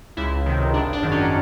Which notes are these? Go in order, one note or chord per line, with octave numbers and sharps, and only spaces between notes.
C#2 E4
C3 D#3
G#1 D4
D4
F#2 D#3
C#4